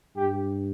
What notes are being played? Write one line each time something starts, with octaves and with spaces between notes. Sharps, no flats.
G2 G4